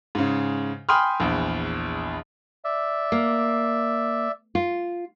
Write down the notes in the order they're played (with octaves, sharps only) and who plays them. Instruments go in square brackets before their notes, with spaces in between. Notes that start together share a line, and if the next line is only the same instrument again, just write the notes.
[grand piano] G#2 C#3
G5 G#5 B5 C6 D#6 F6
A#1 E2
[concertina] D5 E5
[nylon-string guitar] A#3
F4